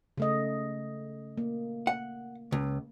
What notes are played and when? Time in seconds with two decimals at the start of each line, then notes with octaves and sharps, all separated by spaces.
0.17 C#3 A3 D#5
1.38 A#3
1.87 F#5
2.52 C#2